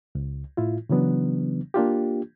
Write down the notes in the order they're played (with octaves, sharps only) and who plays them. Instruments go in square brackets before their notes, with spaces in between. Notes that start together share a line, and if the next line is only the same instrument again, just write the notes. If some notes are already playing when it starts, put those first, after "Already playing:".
[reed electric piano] C#2
A2 E4 F4
C#3 E3 F#3 B3 D4
A#3 D4 F4 G4